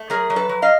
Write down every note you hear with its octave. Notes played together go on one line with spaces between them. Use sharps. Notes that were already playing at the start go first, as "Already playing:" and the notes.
Already playing: A3
F#3 G#4 A#4
F#3
A4 B4
F#3
D#5 F5